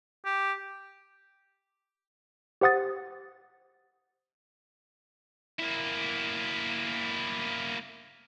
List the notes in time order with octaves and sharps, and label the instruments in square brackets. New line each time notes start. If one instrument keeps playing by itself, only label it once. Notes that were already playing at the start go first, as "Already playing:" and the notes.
[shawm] G4
[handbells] G4 C5 F#5 D#6 A6
[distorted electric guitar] A#3 E4